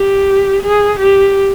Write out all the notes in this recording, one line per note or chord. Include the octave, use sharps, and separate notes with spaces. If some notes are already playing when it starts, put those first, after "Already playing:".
Already playing: G4
G#4
G4